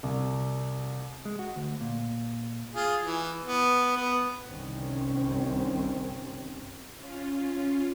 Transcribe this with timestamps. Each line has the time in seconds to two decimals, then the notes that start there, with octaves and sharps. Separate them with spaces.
0.03 C2
1.25 G#3
1.39 F#4
1.56 D2
1.81 A#2
2.75 F4 G#4
3.03 E3
3.45 B3
3.96 B3
4.46 G1 C2 D#3 C4 C#4
6.96 C#4 F4